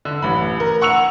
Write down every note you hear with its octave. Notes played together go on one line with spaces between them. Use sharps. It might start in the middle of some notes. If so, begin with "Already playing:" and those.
D3
A1 B5
A#4
F#5 C#6 E6 C#7 F7